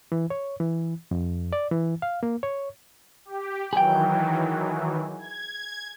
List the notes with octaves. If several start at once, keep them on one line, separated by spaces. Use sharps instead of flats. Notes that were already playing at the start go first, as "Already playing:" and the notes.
E3
C#5
E3
F2
D5
E3
F5
A#3
C#5
G4
D#3 E3 F#3 G#4 G5
G#6